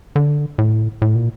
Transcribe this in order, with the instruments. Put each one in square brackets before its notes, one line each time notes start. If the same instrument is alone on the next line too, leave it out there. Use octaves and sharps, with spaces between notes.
[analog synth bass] D3
A2
A2
A#2